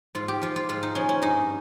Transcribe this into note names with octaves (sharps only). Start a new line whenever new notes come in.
G#2 F4
G4
F3 F4
F4
G#2 F4
D#4
F3 C#4
C#4
G2 D#4